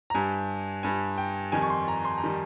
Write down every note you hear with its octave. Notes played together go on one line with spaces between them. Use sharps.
A#5
G2 G3 G#5
G2 G3 G#5
G5
F2 D#3 G3 G#5
C#6
C6
A#5
C6
A#5
D#3 G3